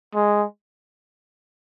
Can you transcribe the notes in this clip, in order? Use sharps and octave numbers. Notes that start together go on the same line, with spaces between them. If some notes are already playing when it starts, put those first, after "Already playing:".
G#3